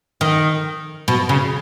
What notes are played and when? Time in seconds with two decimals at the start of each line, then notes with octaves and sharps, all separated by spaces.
0.21 D#3
1.08 B2
1.29 C#3